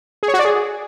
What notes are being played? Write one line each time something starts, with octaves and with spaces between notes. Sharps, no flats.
G#4
C#5
F#4
D5
G#4